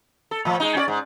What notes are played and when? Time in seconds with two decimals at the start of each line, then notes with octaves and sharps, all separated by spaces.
0.31 A4
0.45 A2 F3
0.60 G#3 D#4
0.75 C#4 F#4 D5
0.88 G#2